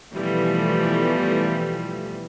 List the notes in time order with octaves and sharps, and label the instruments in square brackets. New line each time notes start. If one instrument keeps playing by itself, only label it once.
[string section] B2 E3 F3 G3 A3